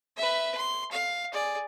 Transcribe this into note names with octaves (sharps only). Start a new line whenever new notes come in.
B4 E5
C6
F5
G#4 D5